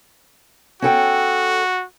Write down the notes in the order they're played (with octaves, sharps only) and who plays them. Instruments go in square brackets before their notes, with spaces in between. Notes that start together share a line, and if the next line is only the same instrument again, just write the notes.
[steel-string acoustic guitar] C#4 A4 G5 [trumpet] F#4